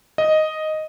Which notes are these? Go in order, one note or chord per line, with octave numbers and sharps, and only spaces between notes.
D#5